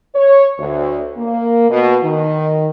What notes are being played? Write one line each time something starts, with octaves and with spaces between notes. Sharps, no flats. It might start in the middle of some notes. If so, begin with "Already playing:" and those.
C#5
D2
A#3
B2
D#3